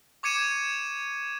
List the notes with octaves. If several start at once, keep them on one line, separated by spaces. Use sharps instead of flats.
C#6 D6 G#6 C#7 D#7 E7